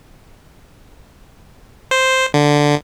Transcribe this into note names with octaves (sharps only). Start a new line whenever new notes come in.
C5
D3